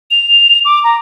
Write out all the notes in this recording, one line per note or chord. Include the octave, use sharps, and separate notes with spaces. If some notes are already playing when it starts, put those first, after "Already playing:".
F7
D6
A#5